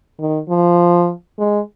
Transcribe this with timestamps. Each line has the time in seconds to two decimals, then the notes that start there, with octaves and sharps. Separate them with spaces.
0.19 D#3
0.49 F3
1.39 G#3